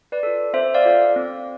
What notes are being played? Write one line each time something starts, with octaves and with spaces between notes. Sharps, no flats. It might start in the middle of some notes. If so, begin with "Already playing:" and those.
B4 D5
F4 A4
C4 C5 E5
D5 F5
F4 A4
C4